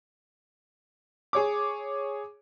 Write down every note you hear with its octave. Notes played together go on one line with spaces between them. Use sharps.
G#4 C#5 D6